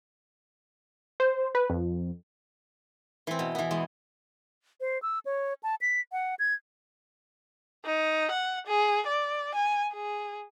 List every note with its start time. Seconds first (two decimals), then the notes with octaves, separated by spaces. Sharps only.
1.20 C5
1.55 B4
1.70 F2
3.27 E3 C4
3.39 B2
3.55 E3 B3
3.71 E2 G#3
4.81 C5
5.02 E6
5.25 C#5
5.63 A5
5.81 B6
6.12 F#5
6.39 G#6
7.85 D#4
8.31 F#5
8.67 G#4
9.07 D5
9.55 G#5
9.93 G#4